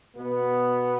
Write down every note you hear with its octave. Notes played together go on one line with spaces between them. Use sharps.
B2 B3